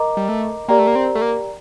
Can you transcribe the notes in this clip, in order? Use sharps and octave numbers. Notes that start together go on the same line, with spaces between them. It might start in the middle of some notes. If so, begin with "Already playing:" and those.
Already playing: A#4 D#5 A#5 D6
G3
A3
A#3 G4 A#4 D5 G5 A#5
A3
A#3
C4
A3
A#3